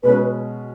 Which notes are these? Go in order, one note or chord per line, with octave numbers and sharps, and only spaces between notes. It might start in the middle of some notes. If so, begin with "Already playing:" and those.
B2 G#3 C#4 B4